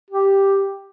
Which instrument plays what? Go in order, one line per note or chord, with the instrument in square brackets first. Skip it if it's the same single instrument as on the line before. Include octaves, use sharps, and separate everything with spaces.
[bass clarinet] G4